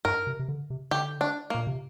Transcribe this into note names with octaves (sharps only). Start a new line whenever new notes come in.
G2 A#4
C3
C3
D3
C3
D3 G4
D4
A#3
A#2
C3